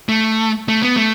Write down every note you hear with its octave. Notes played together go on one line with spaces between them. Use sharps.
A3
A3
B3
A3